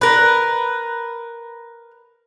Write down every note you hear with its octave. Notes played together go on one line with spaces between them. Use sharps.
A#4 B4